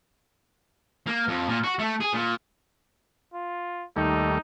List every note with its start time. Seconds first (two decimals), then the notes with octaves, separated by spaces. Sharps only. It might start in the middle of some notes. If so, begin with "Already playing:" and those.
1.06 A#3
1.28 F2
1.48 A#2
1.64 F#4
1.79 A3
2.01 G#4
2.14 A#2
3.34 F4
3.96 D#2 G3 A3 D#4